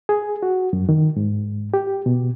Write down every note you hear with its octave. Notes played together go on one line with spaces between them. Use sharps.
G#4
F#4
F#2
D#3
G#2
G4
B2